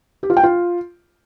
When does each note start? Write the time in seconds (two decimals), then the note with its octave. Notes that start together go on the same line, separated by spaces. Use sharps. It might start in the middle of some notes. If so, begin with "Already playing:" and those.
0.23 G4
0.30 F4
0.37 G5
0.43 F4